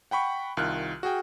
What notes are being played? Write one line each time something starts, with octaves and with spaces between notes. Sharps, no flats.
F#5 G5 B5 C#6
C2 D#3 F4 F6 F#6
F#4 G#4 G5